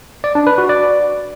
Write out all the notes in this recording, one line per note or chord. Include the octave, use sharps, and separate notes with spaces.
D5
D4
B4
F#4
D5